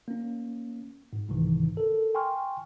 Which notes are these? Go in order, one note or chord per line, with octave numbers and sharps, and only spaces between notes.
A#3 C#4
G#2
C2 G#2 C3 D#3 E3
A4 A#4
G5 G#5 C6 C#6 F6